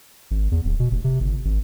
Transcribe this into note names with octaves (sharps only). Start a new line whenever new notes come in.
G#1
E2
D1
B2
F1
C3
G1
G#1